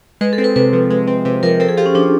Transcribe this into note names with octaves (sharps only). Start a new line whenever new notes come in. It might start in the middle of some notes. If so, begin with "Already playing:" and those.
G#3 B4
A4
C4
B4
C3 B4
F3
G#3
C4
C3
F3 A#4
C4 A4
G#4
F4 G4
C#4
F3 D4